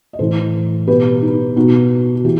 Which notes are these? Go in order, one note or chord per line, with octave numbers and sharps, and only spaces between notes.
D#5
A2 E3 A4 C5
B2 G4 B4
D#4
B2 D#4 F#4
F#4
E3 E4 G4